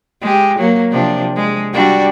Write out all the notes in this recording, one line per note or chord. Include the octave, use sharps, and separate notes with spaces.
G#3 G4
F#3 A#3
C3 F3 D4
G#3
G3 D4 F#4